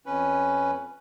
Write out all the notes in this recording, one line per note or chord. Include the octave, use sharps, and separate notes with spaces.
F2 C#4 B4